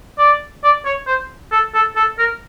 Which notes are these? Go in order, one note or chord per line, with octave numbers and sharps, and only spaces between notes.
D5
D5
C#5
C5
A4
A4
A4
A#4